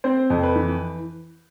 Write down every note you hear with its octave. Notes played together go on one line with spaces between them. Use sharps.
C4 C5
F2
B4
E3